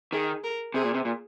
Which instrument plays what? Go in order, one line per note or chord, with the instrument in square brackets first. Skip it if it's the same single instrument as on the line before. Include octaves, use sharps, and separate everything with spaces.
[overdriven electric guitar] D#3 [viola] G#4
[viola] A#4
[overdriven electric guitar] C3 [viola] G#4
[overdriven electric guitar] A#2
C3
A#2